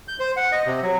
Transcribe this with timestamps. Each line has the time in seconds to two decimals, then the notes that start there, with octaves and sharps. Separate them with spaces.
0.08 G6
0.20 C5
0.36 F#5
0.52 D#5
0.66 C3
0.82 F#3